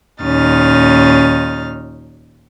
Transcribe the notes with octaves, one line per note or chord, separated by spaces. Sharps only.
D#2 A#2 C#4 D#4 F6 A6